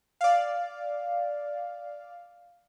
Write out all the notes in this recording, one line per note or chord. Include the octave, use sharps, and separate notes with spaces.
D5 F5